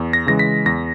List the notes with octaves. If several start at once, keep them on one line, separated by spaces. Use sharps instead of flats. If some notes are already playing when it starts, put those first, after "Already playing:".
Already playing: E2
A#6
C#3 E3 G#3 A#6
B6
E2 A#6